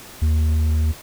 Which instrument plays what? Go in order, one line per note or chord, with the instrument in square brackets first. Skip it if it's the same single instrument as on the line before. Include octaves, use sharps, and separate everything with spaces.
[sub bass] D#2